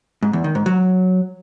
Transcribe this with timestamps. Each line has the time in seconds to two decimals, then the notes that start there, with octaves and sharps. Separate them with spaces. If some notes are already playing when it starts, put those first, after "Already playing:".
0.23 G#2
0.33 E2
0.44 D#3
0.55 G#2
0.66 F#3